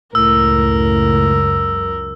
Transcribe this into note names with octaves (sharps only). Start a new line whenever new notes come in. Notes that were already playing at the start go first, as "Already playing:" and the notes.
C#2 F#2 A2 A#4 E6